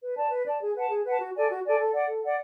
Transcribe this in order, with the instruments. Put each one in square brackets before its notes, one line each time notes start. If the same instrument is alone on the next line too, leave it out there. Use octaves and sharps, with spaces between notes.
[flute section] B4
D5 A5
B4
D5 A5
G#4
B4 F#5 A5
G#4
B4 F#5 A5
F#4
A4 D5 G#5
F#4
A4 D5 G#5
A4
D5 F#5
A4
D5 F#5